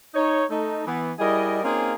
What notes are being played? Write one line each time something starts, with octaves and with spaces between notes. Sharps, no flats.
D#4 C#5
A3 D#4
E3 B3
G3 E4 G#4 A#4 D#5
A#3 C4 C#4 D#4 F4 G#4